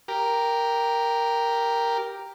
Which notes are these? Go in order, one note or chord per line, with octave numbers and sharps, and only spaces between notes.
G4 A#4